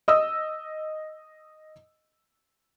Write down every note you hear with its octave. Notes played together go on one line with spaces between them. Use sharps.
D#5 D#6 E6